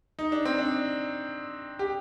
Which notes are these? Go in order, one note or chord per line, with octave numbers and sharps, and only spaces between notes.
D#4
D4
C4
D4
G4